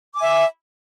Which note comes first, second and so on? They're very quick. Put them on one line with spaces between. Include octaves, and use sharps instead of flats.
D6 G#5 E5